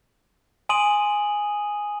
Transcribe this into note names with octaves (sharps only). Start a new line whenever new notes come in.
G#5 C6 D#6 D#7 F#7